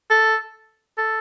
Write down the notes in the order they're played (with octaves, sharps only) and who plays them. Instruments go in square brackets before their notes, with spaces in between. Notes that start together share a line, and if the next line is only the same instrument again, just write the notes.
[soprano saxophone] A4
A4